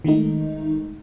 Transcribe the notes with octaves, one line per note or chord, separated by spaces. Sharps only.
D#3 G#3 A3 D#4